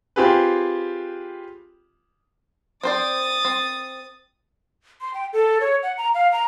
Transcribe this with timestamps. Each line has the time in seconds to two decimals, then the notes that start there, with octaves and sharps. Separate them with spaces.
0.16 C4 F4 G4 G#4 B4
2.83 C4 C5 D5 D#6 A6
3.45 C4
5.01 C6
5.14 G5
5.33 A4
5.61 C#5
5.83 F#5
5.98 A#5
6.14 F5
6.32 A#5